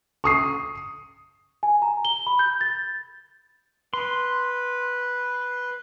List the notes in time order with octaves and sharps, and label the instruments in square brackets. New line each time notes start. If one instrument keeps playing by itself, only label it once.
[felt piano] C#6 D#6 C7
[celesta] G#5
A#5
G7
B5
G6
A6
[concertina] B4 [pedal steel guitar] C6